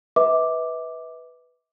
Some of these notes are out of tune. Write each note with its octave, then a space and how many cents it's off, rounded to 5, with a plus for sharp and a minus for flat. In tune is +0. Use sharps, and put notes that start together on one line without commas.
B4 +0 E5 -40 D6 +0